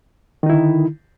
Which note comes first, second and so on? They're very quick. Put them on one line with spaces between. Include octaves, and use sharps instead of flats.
D#3 D#4 E4 D3